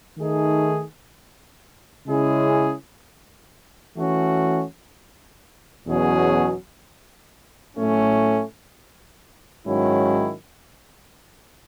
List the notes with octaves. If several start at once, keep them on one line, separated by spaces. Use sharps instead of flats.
D#3 A3 D#4 G#4
C#3 G#3 C#4 E4 G#4
E3 A3 C#4 F#4
E2 B2 F#3 C#4 G#4
A2 F#3 A3 C#4
G#2 D#3 F#3 C#4 E4